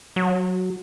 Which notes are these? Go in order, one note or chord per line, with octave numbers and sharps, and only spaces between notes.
F#3